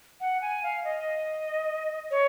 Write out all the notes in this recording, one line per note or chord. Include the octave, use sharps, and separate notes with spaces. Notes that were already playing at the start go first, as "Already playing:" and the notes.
F#5
G#5
F5
D#5
C#5